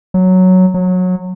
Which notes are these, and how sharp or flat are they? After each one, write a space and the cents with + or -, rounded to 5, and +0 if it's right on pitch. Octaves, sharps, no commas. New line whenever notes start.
F#3 +0
F#3 -20